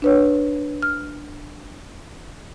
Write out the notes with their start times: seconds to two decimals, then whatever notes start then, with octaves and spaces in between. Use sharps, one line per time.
0.02 D4 B4 C#5
0.82 F6